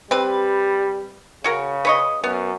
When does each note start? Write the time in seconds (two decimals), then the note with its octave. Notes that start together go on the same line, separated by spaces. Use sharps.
0.11 G3 C4 B4
1.44 C#3 C#4 F#4 A#4
1.85 B4 C#5 D#5
2.24 F#2 B3